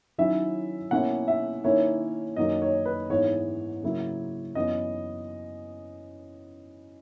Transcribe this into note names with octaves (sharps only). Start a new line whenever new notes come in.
D#3 F#3 C#4 E4 E5
B2 A#3 C#4 E4 F#5
E5
D#3 A#3 C#4 E4 C#5
F#2 D#3 F#3 A#3 C#4 D#5
C#5
B4
G#2 E3 B3 E4 C#5
C#3 F#3 A#3 E4
F#2 E3 B3 D#5